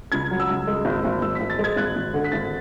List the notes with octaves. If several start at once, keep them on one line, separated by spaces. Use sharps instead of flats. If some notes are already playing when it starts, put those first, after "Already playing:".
C#2 G#6
F#3
E6
C#2
G#3
G#1
G#1
G#1 E6
G#1 B6
A6
G#3
G#6
G#1 F#6
G#1
D3
B6
G#1 A6